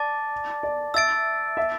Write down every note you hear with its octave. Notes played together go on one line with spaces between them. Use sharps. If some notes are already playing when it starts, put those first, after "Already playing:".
Already playing: D5 A5 D6 A6
D5
E5 E6 A6 D7
E5